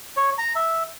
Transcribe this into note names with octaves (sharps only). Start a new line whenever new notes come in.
C#5
A#5
E5